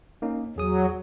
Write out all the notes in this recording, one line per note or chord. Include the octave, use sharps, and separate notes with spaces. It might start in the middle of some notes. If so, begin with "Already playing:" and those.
A#3 C#4 D#4
E2 F#3 G#4 D#6